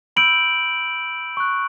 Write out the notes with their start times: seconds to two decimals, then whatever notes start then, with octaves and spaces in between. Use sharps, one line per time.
0.16 B5 E6 G6 D7 F#7
1.37 C#6 F#6